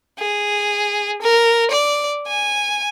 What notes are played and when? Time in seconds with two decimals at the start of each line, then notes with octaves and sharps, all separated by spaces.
0.19 G#4
1.22 A#4
1.71 D5
2.28 G#5